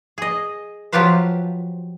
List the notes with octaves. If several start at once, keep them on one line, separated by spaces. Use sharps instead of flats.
G#4 D#5
F3 F#3 F4 G4 B4 C5